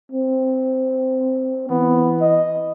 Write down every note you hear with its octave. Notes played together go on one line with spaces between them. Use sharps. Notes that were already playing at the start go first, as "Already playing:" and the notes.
C4
E3 B3
D#5